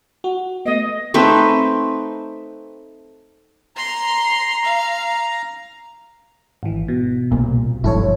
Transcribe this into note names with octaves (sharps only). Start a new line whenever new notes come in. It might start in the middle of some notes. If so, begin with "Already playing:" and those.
F#4
A3 B3 D#5
A3 C4 D#4 B4
A#5 C6
F5
G#1 E3
B2
C2 A#2
G1 G#2 F3 E4 A4 C#5